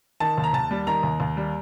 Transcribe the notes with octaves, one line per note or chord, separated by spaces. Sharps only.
D#3 A5
D#2
A#5
D#2 A5
G3
D#3 A#5
D#2
D#2
G3